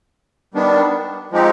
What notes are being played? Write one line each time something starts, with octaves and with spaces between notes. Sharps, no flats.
D#3 G3 B3 D4
F3 G#3 C4 D#4 G4